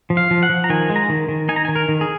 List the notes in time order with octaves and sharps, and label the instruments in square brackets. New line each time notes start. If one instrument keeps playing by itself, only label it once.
[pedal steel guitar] F3
F5
F3
F#5
F3
A#5
D#3 G#5
G#3
A#5
D#3
D#3
D#4 G#5
A#5
D#3 G#5
A#4
D#3
G#4